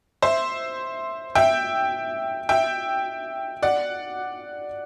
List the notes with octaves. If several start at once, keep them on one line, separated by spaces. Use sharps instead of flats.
C5 E5
E5 G5
E5 G5
D5 F#5